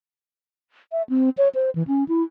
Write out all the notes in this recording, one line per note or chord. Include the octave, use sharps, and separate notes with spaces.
E5
C4
C#5
C5
E3
C#4
E4